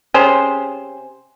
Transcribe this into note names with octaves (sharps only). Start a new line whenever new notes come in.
C3 C#4 G#4 C5